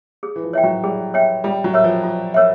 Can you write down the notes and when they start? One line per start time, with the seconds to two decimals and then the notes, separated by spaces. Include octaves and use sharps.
0.23 G#4
0.36 E3
0.43 F3
0.53 C#5 E5 G5
0.64 F#3
0.83 G3 G#4
1.14 C#5 E5 G5
1.44 G3 F4
1.64 F#3
1.74 A#4 C#5 E5
1.84 F3
2.04 F4
2.34 A#4 C#5 E5